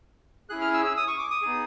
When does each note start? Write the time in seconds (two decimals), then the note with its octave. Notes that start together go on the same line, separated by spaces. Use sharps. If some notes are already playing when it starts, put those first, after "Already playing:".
0.49 C#4 E4 G#4 F#6
0.61 F6
0.74 E6
0.85 E6
0.97 D#6
1.08 C#6
1.19 D6
1.30 D#6
1.42 B3 D#4 G#4